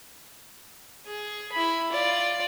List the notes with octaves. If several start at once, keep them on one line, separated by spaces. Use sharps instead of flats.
G#4
E4 B5
F4 D5